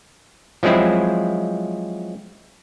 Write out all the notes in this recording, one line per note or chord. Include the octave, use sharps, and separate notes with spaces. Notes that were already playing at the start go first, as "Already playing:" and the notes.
F3 F#3 G#3 C4 E4